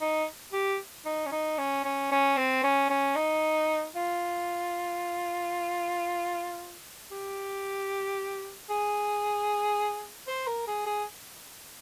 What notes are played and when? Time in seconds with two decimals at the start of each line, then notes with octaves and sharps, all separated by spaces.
0.01 D#4
0.53 G4
1.05 D#4
1.26 C#4
1.32 D#4
1.58 C#4
1.85 C#4
2.12 C#4
2.37 C4
2.64 C#4
2.90 C#4
3.16 D#4
3.96 F4
7.11 G4
8.70 G#4
10.28 C5
10.47 A#4
10.67 G#4
10.86 G#4